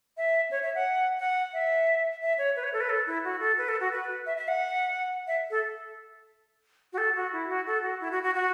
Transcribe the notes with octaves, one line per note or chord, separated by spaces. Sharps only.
E5
C#5
E5
F#5
F#5
E5
E5
C#5
B4
C#5
A4
B4
A4
E4
F#4
A4
B4
A4
F#4
B4
E5
E5
F#5
E5
A4
F#4
A4
F#4
E4
F#4
A4
F#4
E4
F#4
F#4
F#4